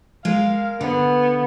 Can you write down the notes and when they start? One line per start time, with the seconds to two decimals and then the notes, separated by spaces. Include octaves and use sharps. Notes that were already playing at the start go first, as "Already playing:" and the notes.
0.25 G#3 A#4 F5
0.81 D3 B3